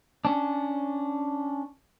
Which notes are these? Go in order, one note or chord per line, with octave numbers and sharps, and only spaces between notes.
C#4 D4